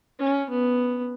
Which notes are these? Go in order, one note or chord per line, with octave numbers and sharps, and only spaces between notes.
C#4
B3